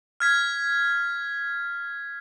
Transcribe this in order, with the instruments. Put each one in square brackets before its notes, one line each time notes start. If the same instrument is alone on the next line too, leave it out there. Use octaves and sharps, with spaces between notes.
[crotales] F6 G#6 B6